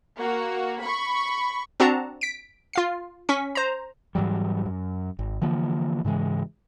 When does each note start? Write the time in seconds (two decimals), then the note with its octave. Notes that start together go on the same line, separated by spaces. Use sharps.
0.19 A#3 F#4
0.82 B5 C#6
1.80 C4 D4 F#4 F#5 A5 A#5
2.21 B6 D7
2.73 F4 F5 C7
3.29 C#4 C#6 B6
3.55 C5 A#5
4.15 G#2 E3 F#3 G3
4.66 F#2
5.19 G#1
5.42 D3 E3 F3 A#3
6.05 G#2 C#3 E3 G#3